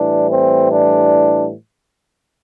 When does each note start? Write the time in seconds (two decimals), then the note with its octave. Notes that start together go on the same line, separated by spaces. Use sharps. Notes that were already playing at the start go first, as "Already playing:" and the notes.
Already playing: A2 E3 G3 D4
0.30 C4
0.71 D4